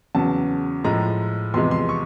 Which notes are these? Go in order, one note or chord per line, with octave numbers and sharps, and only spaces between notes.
E2 C#3 F#3 A5
A2 F3 G#3 A#5
E2 C3 F3 G#3 C6
C6
C#6